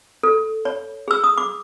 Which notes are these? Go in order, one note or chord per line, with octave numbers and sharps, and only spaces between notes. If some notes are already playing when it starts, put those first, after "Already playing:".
A4
C#5
G#4 E6
D#6
D6